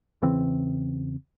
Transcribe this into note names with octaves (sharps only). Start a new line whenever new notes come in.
E2 C#3 E3 C4